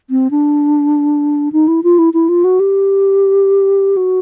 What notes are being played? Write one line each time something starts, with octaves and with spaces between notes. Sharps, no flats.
C4
D4
D#4
E4
F4
E4
E4
F4
F#4
G4
F#4